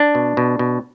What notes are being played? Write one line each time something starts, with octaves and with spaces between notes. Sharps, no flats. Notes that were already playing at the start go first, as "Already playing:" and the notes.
Already playing: D4
B2
B2
B2